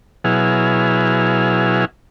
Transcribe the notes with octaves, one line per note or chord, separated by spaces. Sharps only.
B2 F#3 E4 G#4 F6